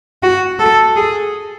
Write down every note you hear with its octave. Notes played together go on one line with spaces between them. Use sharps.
F#4
A4
G#4